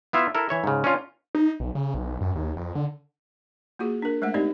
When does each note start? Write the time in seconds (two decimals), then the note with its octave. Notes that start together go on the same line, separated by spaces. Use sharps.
0.13 B3 E4 F4 E5
0.35 E4 A4 A#4
0.49 E3 C#5 E5
0.64 G#2 C#3
0.84 C#4 D4 F4
1.35 D#4
1.60 B1
1.75 C#3
1.94 B1
2.21 F#2
2.35 D#2
2.56 F2
2.75 D3
3.79 A#3 F4 F#4 G#4
4.02 D4 A#4
4.22 G#3 A3 C5 E5 F#5
4.34 C4 D#4 G4 D5 D#5